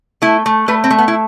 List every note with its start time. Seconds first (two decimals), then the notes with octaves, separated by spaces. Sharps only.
0.22 A3 E4
0.46 A3
0.68 A3 B4
0.84 C4
0.90 A3
0.98 B3
1.08 E4